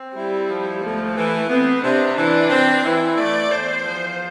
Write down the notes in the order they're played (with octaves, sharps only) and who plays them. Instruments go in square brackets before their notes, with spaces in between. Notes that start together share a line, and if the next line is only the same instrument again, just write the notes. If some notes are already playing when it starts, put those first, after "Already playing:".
Already playing: [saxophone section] C4
[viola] G3 [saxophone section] E4
[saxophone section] F3
[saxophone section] D2 [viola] A3
[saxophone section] E3 [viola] A3
[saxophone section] B3 [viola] C4
[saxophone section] C3 [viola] D4
[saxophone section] E3 [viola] D4
[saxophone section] C4
[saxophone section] E3 [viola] E4
[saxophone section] A3 [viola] D5
[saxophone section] E2 [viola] C5
[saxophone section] F3